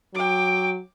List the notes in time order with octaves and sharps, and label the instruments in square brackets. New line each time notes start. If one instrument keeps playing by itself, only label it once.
[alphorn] F#3 [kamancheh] G5 D6